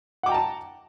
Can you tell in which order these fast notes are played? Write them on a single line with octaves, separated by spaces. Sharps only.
F#5 D6 G5 A#5 A5